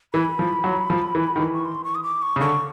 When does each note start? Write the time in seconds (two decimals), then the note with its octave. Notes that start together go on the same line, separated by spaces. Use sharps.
0.14 E3 B5
0.39 F3
0.64 F#3
0.90 F3
1.15 E3
1.36 D#3
1.40 E3
1.54 C#6
1.65 C6
1.84 C#6
1.95 D#6
2.03 D6
2.22 C#6
2.36 C#3
2.41 D3 C#6